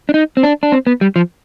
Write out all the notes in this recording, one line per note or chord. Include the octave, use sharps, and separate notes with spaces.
D4
D#4
C4
D4
D4
C4
B3
G3
F3